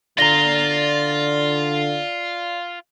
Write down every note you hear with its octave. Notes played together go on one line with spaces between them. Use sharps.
D3 F4 D5 A#5 A#6 G7